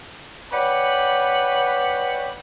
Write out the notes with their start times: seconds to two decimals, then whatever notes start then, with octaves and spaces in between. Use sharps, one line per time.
0.52 B4 C#5 D5 F#5 G5 B5